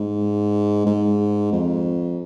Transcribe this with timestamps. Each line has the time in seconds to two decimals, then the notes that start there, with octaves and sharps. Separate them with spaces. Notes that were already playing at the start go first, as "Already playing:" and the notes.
Already playing: G#2
0.86 G#2
1.52 F2